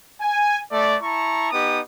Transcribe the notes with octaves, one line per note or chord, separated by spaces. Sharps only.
G#5
A3 D5
E4 A5 A#5 C#6
B3 D#4 G4 D#6